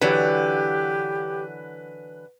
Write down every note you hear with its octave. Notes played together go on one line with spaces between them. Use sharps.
D3 E3 F#3 G4 B4